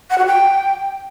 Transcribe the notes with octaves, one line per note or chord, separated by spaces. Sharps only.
F#5
F#4
G5